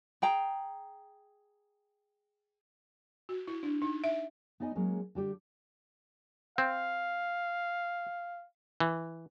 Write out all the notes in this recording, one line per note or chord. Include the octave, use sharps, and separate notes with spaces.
G#4 G5 A#5
F#4
E4
D4
D#4
E5
B3 D#4 D5 D#5 G#5
F#3 G#3 A#3 C#4 G#4
D3 G3 G4
C4 F5
E3